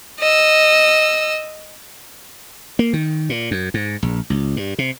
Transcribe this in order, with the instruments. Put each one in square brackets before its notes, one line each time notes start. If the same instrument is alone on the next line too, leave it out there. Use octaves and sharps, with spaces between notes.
[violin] D#5 E6
[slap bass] A#3
D#3
A#2
F#2
G#2
A#1
C#2
G2
C3